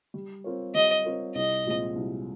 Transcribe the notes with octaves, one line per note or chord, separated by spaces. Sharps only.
G3
C4 F4 A#4 C#5
G3 D#5
C4 F4 A#4 C#5
C2 D#5
A#2 F3 G#3 C4
C2